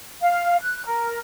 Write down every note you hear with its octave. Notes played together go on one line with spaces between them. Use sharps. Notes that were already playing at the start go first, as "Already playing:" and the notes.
F5
F#6
A#4